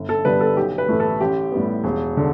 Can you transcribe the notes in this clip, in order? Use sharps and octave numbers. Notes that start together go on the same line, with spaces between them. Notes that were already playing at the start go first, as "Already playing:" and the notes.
Already playing: G1
A4
G2 D3 G3 B3 B4
A4
B1 G4
B4
A2 E3 A3
A4
A1 G4
A2 G3 B3
E1
D3